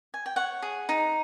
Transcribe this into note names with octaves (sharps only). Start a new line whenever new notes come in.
G#5
G5
C#5 F#5
G#4
D#4